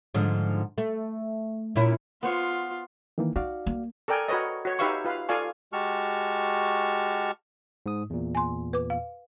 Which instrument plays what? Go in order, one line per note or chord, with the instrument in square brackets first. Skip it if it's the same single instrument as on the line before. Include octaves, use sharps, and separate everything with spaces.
[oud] G#2 D3 F3
A3
A#2 C#4 E4
[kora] B3 C5 C#5 [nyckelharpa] F4
[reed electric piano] D#3 E3 A#3
[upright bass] D#4 [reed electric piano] F#4 D5 F5
[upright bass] A#3
[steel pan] A4 A#4 D5 G5 G#5
F#4 A#4 B4 C#5 D#5
F#4 C#5
D#4 G4 B4 E5 F5 C#6
F4 B4 F5
F4 A4 D5 F5 G#5 C#6
[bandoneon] G#3 F#4 G4 A5 C#6 F6
[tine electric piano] G#2 D#6
E2 A#2
[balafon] G#5 C6
B4 D6
F5